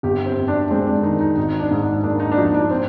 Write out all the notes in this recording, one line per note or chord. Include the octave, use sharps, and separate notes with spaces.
G1 G4
C4
F2
D4
G#3 C4
D4
D#3 D#4
D#4
G#1 D#4
D4
G#2
D4
A#3 D4
D#4
D4
F3 D#4
D4
C4